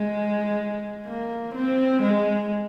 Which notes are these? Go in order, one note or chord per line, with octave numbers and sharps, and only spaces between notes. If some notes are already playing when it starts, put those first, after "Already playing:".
Already playing: G#3
A#3
C4
G#3